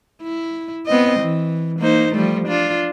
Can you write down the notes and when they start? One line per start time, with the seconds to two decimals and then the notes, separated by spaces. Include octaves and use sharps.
0.22 E4
0.86 B3 C4 D#5
1.19 E3
1.79 A#3 D#4 C5
2.13 F3 G3 A3
2.48 D4 F4